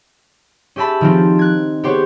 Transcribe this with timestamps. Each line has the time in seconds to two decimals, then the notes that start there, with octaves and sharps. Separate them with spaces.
0.76 C#4 G4 E5 A5 B5
1.01 D#3 F3 C4
1.39 F#6 G#6
1.83 B3 G4 C5 C#5